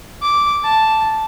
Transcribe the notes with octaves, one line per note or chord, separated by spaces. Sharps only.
D6
A5